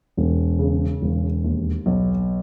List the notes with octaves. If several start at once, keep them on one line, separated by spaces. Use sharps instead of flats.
E1
C#3
E1
D#2
B1